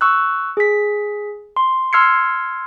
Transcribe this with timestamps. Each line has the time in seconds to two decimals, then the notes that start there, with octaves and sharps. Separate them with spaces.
0.01 C#6 E6 F#6
0.57 G#4 B6
1.57 C6
1.93 C6 E6 F6 G#6 C7 C#7